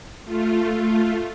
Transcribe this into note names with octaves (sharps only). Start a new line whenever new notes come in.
A3 F4